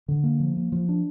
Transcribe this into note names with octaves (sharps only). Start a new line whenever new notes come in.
D3
A#3
F3
A#3
F3
D4